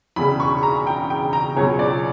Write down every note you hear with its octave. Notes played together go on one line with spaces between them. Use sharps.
E1 E2 C#3 B5
C#6
A#5
G5
G5
A#5
C#2 B2 F#3 C#5
D5